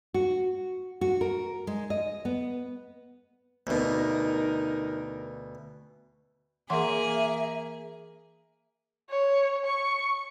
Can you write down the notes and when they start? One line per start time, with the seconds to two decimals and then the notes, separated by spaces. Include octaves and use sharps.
0.14 F#4
1.01 F#4
1.21 A#4
1.67 G#3
1.90 D#5
2.25 B3
3.67 D2 B2 D#4 A#4
6.70 E3 A#3 G#4 A#4 E5 F#5 C6
9.10 C#5
9.66 C#6